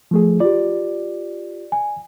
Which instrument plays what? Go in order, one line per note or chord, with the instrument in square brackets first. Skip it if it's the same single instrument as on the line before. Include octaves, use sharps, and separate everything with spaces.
[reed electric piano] F3 A3 G#4
[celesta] F4 G4 [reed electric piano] D5
[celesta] G#5